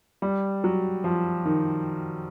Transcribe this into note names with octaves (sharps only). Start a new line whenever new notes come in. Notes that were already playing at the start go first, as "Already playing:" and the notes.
G3
F#3
F3
D#3